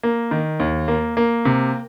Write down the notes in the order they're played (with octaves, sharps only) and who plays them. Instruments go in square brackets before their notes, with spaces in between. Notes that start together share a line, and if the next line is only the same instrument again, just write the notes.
[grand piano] A#3
D#3
D#2
A#3
A#3
C3